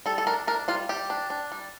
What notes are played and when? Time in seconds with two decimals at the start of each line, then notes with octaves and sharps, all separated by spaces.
0.06 G3 A4
0.18 A4
0.27 D4 A#4
0.47 D4 A#4
0.68 G3 F4
0.89 G3 G4
1.10 D4
1.30 D4
1.52 G3